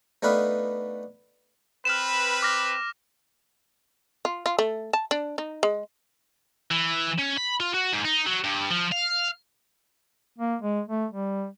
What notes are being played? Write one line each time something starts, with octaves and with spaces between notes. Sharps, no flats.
A3 B3 D4 D#4 B4 F5
C4 B4 F6 E7
D6 F6 A#6
F4
F4
A3
A5
D4
D#4
G#3
E3
C#4
B5
F4
F#4
G#2
D#4
F#3
G2
F3
F5
A#3
G#3
A3
G3